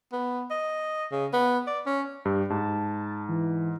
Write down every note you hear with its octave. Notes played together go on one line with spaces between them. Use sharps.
B3
D#5
C#3
B3
D5
C#4
G2 G4
G#2 A5
E3